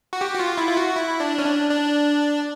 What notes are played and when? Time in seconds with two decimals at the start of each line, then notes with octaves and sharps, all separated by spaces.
0.13 F#4
0.21 G4
0.35 F#4
0.40 F4
0.58 E4
0.67 F4
0.77 F#4
0.96 E4
1.20 D4
1.38 C#4
1.45 D4
1.70 D4